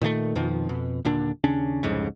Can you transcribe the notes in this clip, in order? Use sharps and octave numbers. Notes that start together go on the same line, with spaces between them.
A#2 D#3 F#3 A3
F2 B2 D#3 F3
F2 B2
D#1 A#2 D3 D4
D#2 C#3 C#4 D4
C2 F2 G#2 C#3